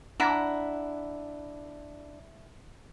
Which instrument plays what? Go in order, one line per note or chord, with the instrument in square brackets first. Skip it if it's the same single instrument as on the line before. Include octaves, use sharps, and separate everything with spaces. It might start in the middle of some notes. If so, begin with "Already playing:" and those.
[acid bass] D4 [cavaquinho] E4 F#5 A#5